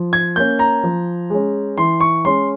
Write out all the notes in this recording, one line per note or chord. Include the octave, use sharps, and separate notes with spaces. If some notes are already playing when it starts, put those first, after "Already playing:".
Already playing: F3
G#6
A#3 C#4 G6
A#5
F3
G#3 C#4
E3 C6
C#6
G#3 C#4 C6